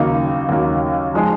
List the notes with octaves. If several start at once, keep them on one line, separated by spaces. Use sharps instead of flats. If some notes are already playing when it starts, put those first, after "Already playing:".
Already playing: D#2 C#3 F#3 A#3 D#4
D#2 C#3 F#3 A#3 D#4
F3 G#3 D#4 G#4